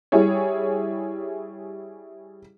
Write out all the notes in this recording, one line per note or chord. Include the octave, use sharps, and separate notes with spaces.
G3 E4 G#4 C#5